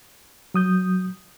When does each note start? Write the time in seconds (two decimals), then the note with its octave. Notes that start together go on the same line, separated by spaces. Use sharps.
0.54 F#3 D#6 G6